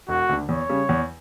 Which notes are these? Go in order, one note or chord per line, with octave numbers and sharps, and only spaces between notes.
E1 F#4
D2 D3
E2 C#5
C#3 G3
E2